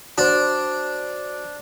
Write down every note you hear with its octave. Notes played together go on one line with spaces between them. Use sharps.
D4 F#4 C5